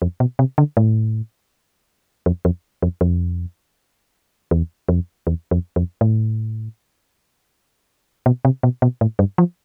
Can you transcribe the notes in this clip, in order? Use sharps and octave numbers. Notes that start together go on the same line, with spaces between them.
F2
B2
C3
D3
A2
F2
F2
F2
F2
E2
F2
E2
F2
F2
A2
B2
C3
B2
B2
A2
G2
F3